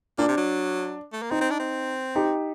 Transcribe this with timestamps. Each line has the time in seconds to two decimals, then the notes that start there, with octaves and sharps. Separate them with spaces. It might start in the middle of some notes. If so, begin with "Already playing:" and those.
0.18 A#2 D4
0.28 C3
0.37 F#3
1.13 A3
1.22 A#3
1.31 C4 D#4
1.41 C4
1.50 D4
1.60 C4
2.15 D#4 G4